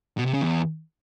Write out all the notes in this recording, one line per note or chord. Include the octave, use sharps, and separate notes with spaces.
B2
C3
C#3
E2